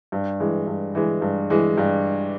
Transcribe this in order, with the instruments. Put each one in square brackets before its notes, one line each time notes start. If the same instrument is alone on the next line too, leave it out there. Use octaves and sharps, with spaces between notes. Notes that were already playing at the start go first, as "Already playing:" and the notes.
[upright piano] G2
E3 G#3
G2
E3 G#3
G2
E3 G#3
G2